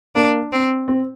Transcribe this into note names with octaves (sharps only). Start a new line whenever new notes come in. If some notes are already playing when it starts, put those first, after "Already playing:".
A#3 D4
C4
C4